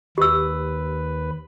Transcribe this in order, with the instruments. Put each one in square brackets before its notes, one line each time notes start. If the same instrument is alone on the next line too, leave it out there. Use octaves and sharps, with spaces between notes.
[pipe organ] D#2 B4 [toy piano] G4 E6